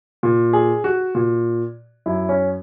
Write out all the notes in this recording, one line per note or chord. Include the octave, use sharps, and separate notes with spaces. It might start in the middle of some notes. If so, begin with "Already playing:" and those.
A#2
G#4
F#4
A#2
F#2 E4
C#4